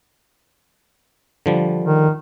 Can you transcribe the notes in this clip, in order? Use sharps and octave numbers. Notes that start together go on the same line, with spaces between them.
D3 F3 G3
D#3